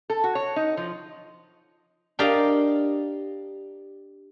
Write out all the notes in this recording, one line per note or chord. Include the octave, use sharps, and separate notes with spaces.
A4
F#4
C#5
D#4
F3
D4 G4 A#4 D5 D#5 F5